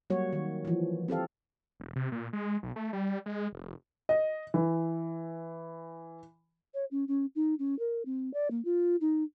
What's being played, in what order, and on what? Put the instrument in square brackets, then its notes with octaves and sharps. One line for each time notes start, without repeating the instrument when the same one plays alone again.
[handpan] F#3 G3 A#3 F#4 C#5
D#3
E3 F3
C4 G4 A4 F5
[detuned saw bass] E1
C3
A#2
G#3
B1
A3
G3
G#3
F1
[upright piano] D#5
E3
[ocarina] C#5
C#4
C#4
D#4
C#4
A#4
C4
D5
A#3
F4
D#4